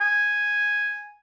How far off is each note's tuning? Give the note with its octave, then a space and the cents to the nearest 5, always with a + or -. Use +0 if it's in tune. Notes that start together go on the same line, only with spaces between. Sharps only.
G#5 -5